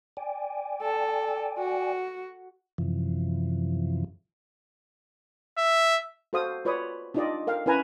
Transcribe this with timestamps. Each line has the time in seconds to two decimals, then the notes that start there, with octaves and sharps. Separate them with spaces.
0.17 D5 G5 G#5
0.82 A4
1.59 F#4
2.78 F#2 C3 E3 F3
5.58 E5
6.33 F#4 A4 C5 F5 D#6
6.65 F4 B4 C#5 D5 B5 D#6
7.14 D4 D#4 F4 G4 D5 D#5
7.47 A4 A#4 F5 G5
7.66 C#4 E4 B4 G#5 A#5